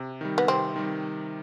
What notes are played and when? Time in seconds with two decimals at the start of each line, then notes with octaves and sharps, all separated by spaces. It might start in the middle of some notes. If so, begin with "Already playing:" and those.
Already playing: C3
0.21 D#3 G3
0.38 B3
0.48 C3 C4
0.76 D#3 G3